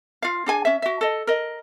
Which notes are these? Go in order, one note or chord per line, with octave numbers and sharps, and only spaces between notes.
F4 F5
D4 G#4 G#5
C#4 E5
F#4 E5
A4 D#5
A#4 D#5